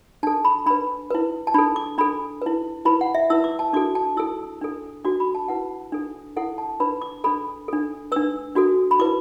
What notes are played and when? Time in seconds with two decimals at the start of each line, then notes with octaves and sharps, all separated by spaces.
0.23 D4 A5
0.27 A4
0.45 B5
0.66 D4 B4 B5
1.10 E4 B4
1.47 A5
1.54 D4 A4 B5
1.76 D6
1.98 D4 A4 B5
2.42 E4 B4
2.85 E4 B4 B5
3.01 F#5
3.15 E5
3.30 E4 B4 E6
3.44 D6
3.59 A5
3.73 D4 F#4 A4 D6
3.95 A5
4.17 E4 A4 E6
4.61 D4 A4
5.05 D4 F#4 A4 D6
5.20 B5
5.35 A5
5.48 E4 B4 F#5
5.92 D4 A4
6.36 E4 A4 F#5
6.58 A5
6.80 D4 B4 B5
7.02 D6
7.24 D4 A4 B5
7.68 D4 A4
8.12 D4 B4 E6
8.55 D4 F#4 A4
8.91 B5
8.99 E4 B4 D6